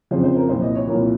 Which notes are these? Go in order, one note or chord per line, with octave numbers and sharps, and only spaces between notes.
F2 C#3 F3 C5
C5
A#4
C2 A#2 F3 C5
D#5
C#5
C2 A#2 F3 A#4